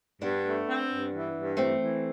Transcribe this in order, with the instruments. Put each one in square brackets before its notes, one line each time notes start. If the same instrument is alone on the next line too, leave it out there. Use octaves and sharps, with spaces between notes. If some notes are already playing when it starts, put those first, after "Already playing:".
[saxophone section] G2 [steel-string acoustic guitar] B3 D4
[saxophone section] A3
C4
G2
E3
G2
[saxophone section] E3 [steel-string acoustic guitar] A3 C4
[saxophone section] E3